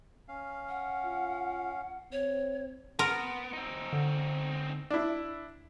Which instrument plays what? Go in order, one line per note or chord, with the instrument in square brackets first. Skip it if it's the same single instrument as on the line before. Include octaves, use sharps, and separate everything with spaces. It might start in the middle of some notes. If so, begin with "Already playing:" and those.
[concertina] C#4 F5
[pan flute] F#5
[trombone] F4
[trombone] C4 [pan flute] C#5
[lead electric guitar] B3 [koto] A#4 [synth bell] C6 D7
[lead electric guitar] C4 D#4
[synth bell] D3
[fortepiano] D4 E4